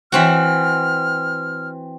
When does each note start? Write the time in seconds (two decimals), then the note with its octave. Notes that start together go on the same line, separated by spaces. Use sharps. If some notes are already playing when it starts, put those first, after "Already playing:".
0.12 E3 C4 F#4 F6